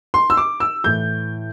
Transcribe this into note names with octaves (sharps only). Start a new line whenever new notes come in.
C6
E6
D6
E6
A2 E3 G6